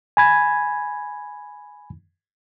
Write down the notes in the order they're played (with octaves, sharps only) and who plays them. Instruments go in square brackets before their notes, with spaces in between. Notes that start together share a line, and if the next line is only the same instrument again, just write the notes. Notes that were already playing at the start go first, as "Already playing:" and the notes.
[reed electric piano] G#5 B5 G#6